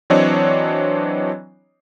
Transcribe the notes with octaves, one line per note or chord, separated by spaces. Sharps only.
E3 F#3 C4 D4 C#5 D#5